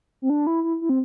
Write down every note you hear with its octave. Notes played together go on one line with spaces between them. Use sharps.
C4
D4
E4
E4
E4
C4